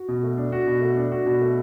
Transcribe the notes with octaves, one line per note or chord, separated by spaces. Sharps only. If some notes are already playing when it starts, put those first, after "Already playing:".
Already playing: F#4
B2
A3
D4
F#4
B2
A3
D4
F#4
B2
A3